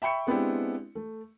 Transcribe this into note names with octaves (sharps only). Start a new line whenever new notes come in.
E5 G5 B5 C#6 C#7
G#3 B3 C4 D4 E4 G4
A3